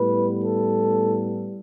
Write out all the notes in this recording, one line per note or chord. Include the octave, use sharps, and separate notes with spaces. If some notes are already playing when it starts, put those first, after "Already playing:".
Already playing: A2 G3 B3 B4
A4